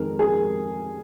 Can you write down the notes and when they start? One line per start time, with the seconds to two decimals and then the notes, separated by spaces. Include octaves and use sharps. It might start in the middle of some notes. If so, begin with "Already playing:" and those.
Already playing: F2 D#3 G#3 A#4
0.19 G#4